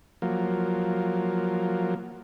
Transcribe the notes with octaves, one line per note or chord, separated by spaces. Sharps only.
F3 F#3 A#3